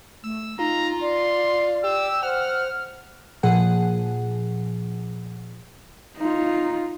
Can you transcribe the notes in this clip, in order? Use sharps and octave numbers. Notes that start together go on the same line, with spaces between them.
A3 E6
D#4 F4 A#5
D5 C6
G4 E6
C5 F#5 F6
A#2 F3 G#4 F#5
D#4 F4